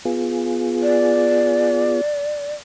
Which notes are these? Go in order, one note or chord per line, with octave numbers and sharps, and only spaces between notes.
B3 F4 G#4
D5